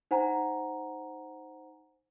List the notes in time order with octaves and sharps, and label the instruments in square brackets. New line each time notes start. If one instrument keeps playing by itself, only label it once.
[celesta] D#4 C5 F#5 G#5 A#5